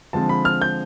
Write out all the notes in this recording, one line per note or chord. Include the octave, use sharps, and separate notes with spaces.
D3 F3 G#3 C4 A5
B5
F6
G6